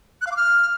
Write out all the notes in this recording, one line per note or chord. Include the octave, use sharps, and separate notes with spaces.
F#6
F5
D6
F6